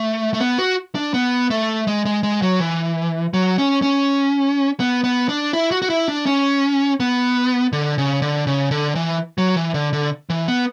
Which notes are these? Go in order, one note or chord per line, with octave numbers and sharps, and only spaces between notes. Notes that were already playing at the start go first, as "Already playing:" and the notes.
Already playing: A3
A3
B3
F#4
D4
B3
A3
G#3
G#3
G#3
F#3
E3
F#3
C#4
C#4
B3
B3
D4
E4
F#4
F#4
E4
D4
C#4
B3
D3
C#3
D3
C#3
D3
E3
F#3
E3
D3
D3
E3
B3